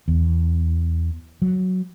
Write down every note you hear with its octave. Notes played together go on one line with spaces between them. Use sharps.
E2
F#3